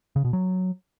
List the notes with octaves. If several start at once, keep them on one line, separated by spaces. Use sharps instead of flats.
C#3
B2
F#3